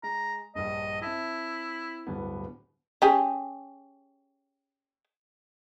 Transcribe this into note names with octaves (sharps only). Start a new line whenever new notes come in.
G#3 A#5
A#1 G2 D#5
C4 E4 E5 A5
D1 G2 B3
C#4 G4 G#4